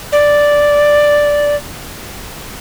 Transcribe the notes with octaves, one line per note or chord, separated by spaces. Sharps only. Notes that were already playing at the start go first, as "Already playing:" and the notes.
D5